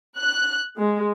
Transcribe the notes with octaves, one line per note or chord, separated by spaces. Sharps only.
F#6
G#3